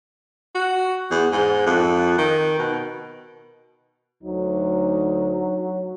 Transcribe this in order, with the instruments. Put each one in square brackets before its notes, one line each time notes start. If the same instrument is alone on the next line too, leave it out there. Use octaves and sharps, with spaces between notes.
[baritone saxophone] F#4
E2
G#2
F2
D#3
B2
[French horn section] D2 D#4 [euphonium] F#3